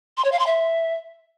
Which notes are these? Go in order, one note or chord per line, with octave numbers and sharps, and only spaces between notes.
C6
C#5
F5
C6
E5